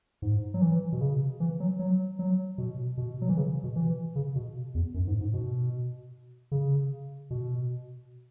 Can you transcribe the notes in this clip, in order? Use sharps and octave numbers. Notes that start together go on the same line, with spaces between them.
G#2
F#3
E3
B2
C#3
E3
F#3
F#3
F#3
B2
B2
F#3
E3
C#3
B2
E3
C#3
B2
E2
F#2
G#2
G#2
B2
C#3
B2